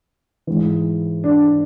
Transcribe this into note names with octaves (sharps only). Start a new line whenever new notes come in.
G#2 E3
D4